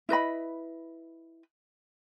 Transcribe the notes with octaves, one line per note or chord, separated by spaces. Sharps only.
E4 B4 D#5 B5